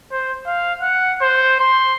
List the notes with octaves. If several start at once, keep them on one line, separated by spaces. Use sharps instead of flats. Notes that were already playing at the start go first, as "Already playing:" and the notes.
C5
F5
F#5
C5
C6